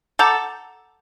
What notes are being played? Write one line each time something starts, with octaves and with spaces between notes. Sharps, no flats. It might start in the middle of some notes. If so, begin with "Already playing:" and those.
A4 F#5 A#5 D6 G6